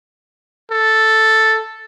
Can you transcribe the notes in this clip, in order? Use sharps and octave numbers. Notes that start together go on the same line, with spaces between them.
A4